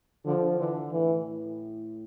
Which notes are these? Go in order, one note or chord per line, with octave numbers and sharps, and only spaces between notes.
D3 F3
D3 E3
A2 E3